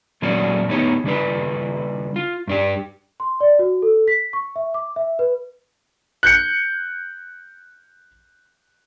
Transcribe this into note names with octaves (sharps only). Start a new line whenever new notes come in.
A#2 F#3 A#3 C#4 D4 F#4
A2 B3 D#4 G4 C#5
C#3 G3 D4 B4
F4
G2 D4 G4
C6
D5
F#4
A4
B6
C#6
E5
D6
E5
B4
F#6 G6 C#7